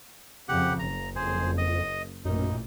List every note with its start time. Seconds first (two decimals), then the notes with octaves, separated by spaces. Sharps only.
0.48 F2 C#3 G4 F#5
0.79 F#1 A#5
1.16 F2 G#4 C5
1.58 D#5
2.25 A1 F#2 A#2 D#4